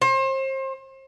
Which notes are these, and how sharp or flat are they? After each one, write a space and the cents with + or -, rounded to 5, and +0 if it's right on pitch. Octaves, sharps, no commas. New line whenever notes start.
C5 +35